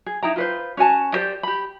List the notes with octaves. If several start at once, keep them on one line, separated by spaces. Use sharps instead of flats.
G#4
D#4 E4 G5 A#5
F4 B4 C5
C#4 F#4 G#5 A5
E4 G4 C5 D5
G4 B5